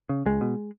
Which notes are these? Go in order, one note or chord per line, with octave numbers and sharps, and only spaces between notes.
C#3
C#2 G#3
B2